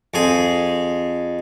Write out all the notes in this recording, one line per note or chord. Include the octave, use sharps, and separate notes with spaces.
F2 G#4